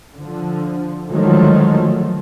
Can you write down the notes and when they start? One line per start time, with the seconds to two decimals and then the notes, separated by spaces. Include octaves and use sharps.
0.16 D3 F3
1.08 D3 D#3 F3 F#3 G#3 A3